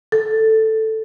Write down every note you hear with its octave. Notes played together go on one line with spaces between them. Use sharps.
A4